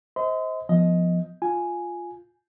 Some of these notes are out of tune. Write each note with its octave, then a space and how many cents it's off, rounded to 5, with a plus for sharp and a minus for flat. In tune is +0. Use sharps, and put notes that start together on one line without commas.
C5 +0 D#5 +35 C6 -35
F3 +0 B3 +0 D#5 +10
F4 +0 G#5 +0